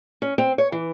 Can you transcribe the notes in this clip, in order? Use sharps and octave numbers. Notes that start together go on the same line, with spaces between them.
C#4
C4
C#5
E3